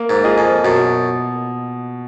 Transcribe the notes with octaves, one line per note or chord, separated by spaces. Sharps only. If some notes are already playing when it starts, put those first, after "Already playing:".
Already playing: A#3
G#2
F4 G#4 D#5
F2
F#2 B2